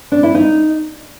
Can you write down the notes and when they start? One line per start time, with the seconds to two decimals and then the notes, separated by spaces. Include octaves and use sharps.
0.12 D4
0.23 E4
0.35 D#4